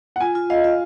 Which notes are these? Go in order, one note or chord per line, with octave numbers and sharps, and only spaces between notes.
F#5
F4 G#5
F4
D#5 F5
F4